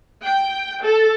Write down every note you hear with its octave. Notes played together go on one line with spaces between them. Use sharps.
G5
A4